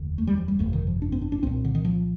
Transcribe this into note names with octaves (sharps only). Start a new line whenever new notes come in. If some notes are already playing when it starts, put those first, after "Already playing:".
Already playing: F1 D#2 D3
A3
G3
F3
G3
G1 F2 C3 A3
D#3
F3
D4
C4
D4
D4
C2 A#2 C4
D3
D#3
F3